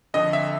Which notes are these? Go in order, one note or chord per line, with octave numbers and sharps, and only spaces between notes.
F2 D3 D#5
E5